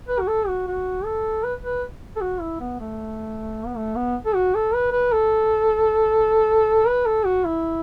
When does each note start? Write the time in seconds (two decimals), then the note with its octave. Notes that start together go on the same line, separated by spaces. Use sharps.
0.09 B4
0.20 F#4
0.28 A4
0.48 F#4
0.67 F#4
1.05 A4
1.43 B4
1.64 B4
2.16 A4
2.21 F#4
2.41 E4
2.60 B3
2.80 A3
3.66 B3
3.76 A3
3.96 B3
4.26 A4
4.35 F#4
4.54 A4
4.74 B4
4.92 B4
5.12 A4
6.87 B4
7.06 A4
7.25 F#4
7.45 E4